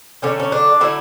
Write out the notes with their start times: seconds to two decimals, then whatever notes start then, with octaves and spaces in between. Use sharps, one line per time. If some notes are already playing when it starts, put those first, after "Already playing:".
0.22 D3 F#3 A3 C#4
0.40 C#4
0.52 D4
0.81 D3 F#3 A3 E4